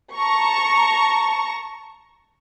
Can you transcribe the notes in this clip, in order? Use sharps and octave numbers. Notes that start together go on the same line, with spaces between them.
A5 A#5 C#6